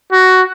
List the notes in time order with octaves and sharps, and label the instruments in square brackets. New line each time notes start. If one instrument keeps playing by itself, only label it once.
[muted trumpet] F#4